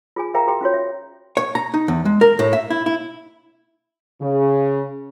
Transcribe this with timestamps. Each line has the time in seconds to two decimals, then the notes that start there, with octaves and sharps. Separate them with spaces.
0.16 F4 G#4 G#5
0.34 G#4 A#4 E5 F5 G5 A#5
0.47 F#4 G#4 G5
0.61 C#4 F4 F#4 C#5
0.74 E5
1.37 C#5
1.55 A#5
1.74 D#4
1.88 E2
2.05 G#3
2.21 A#4
2.39 A2
2.53 E5
2.70 E4
2.86 E4
4.21 C#3